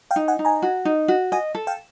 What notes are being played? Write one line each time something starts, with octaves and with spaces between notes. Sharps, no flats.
F5 G5
D#4
F#5 G#5
D#4
G#5 A#5
F#4
D#4
F#4
D#5 F#5 G#5
A4
F5 G5